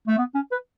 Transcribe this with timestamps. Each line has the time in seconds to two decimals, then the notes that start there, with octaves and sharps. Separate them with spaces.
0.08 A3
0.18 B3
0.35 C#4
0.51 B4